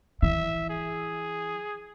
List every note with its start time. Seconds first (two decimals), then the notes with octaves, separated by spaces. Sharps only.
0.22 E3 E5
0.70 G#4